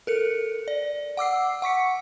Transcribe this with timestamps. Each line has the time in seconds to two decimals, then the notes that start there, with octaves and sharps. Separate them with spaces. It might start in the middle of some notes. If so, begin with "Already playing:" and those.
0.07 A4 A#4 C#7
0.68 D5
1.17 F#5 D6 E6 C7
1.62 F#5 C#6 B6 C#7